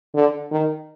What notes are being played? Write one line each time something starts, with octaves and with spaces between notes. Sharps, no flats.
D3
D#3